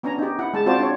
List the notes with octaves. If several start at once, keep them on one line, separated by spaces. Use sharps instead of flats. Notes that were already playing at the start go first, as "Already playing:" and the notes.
B3 C#4 D4 G#5 A#5
D#4 G4
E4 F#5
G#3 A5
C4 F4 F#4 C5 D5 A5
D4 C#5